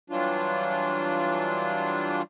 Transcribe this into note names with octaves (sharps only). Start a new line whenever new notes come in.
E3 F#3 G3 D4 F4